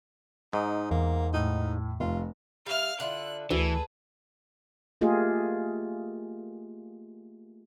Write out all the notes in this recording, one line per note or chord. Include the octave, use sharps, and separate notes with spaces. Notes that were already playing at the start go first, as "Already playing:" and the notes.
G#2 D#4
E2 A#3
A2 D#4
F1 F4
G3 E5 F5 F6
D3 E4 F4 F#6
D2 E3 G#4 A4 B4
A3 A#3 F4 G4 G#4 D#5